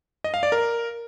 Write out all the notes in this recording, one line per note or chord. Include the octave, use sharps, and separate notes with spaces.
D#5
F5
D5
A#4